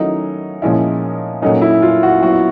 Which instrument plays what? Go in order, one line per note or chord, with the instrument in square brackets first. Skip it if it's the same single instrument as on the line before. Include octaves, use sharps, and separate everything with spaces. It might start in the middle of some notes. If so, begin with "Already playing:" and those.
Already playing: [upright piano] D#3 F#3 A3 C#4 E4 [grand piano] D#4
[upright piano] A#2 F3 G#3 C#4 E4
[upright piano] A#2 F#3 A3 C#4 [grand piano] D#4
[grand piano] E4
F4
F#4
[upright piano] F#3 B3 E4 [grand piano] F#4